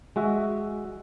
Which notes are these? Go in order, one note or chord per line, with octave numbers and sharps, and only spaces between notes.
G#3 F#4 E5